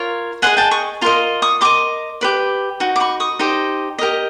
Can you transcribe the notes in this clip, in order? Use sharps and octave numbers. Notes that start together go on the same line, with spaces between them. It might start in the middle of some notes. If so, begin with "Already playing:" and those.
Already playing: F4 A#4 C#5
G#4 C5 D#5 F#5 G#5
G5 A5
C#6 D#6
F4 A#4 D#5 A#5 C6
C#6 D#6
G4 A#4 D#5 C6 D6
G4 B4 D5
D#4 F#4
D6
B5 C#6
C#6 D#6
D#4 G4 C5 D#5
G4 A#4 D#5